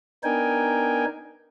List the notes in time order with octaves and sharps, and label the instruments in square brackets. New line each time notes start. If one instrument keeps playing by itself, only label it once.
[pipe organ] B3 D4 D#4 A#4 G5 G#5